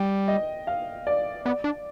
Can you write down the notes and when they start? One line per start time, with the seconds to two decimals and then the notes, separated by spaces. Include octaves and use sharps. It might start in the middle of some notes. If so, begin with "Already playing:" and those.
Already playing: G3 G5
0.28 D#5
0.67 F5
1.07 D5
1.45 B3 D5
1.64 D4